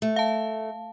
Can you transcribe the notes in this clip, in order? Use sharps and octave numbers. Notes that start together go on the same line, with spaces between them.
A3
F5 A5